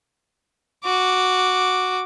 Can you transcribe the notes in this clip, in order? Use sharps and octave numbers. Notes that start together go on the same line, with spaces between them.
F#4 D6